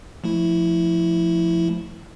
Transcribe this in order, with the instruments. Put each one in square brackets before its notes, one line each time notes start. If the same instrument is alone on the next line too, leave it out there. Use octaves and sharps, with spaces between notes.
[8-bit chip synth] F3 A3 E4